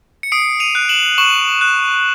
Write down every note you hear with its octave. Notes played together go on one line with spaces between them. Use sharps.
C#7
D#6 C7 D7
D#7 F7
F#6
E7 F#7
C#6 E7 F#7
F#6